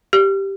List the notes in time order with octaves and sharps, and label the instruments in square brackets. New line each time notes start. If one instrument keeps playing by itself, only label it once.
[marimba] G4